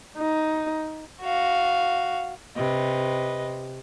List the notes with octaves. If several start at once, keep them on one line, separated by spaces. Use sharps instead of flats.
D#4
F#4 F5
C3 B4 D#5